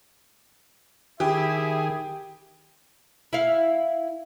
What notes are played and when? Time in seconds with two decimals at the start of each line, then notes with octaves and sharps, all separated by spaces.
1.20 D#3 E4 G4 G#4 E5
3.33 E4 F5